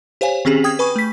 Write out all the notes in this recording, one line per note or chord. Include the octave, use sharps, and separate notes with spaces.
G4 C5 C#5 F5 G#5
D#3 C4 C#4 G4 G#4
G5 D#6 G#6
B4 G#5 B5 C#6
A3 B6